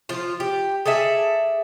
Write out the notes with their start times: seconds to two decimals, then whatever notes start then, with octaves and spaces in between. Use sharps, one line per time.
0.09 F3 F4
0.40 G4
0.86 G#4 A4 D5 E5